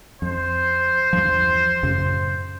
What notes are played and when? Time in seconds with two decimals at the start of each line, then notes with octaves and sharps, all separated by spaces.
0.22 F2 C5
1.13 E2 G2 F3
1.83 F#2 A2 C#3